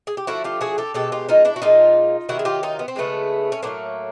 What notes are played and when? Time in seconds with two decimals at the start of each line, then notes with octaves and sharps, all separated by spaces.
0.07 G#4
0.17 G4
0.27 D3 F3 A3 E4 F#4
0.44 F4 G4
0.61 F#4 G#4
0.78 G4 A4
0.94 B2 G#3 G4 A4
1.12 F4 G4
1.29 D#4 F4
1.45 D4 E4
1.56 F#4
1.62 A#2 F3 G#3 D#4 F4
2.29 C3 D#3 F#3 E4 F#4
2.39 G#4
2.45 F4 G4
2.63 D#4 F4
2.79 B3
2.88 C4
2.96 C#3 F3 G#3 A3 B3
3.52 C#4
3.63 A2 F#3 A3 A#3 C4